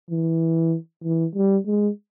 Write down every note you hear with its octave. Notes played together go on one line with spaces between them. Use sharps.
E3
E3
G3
G#3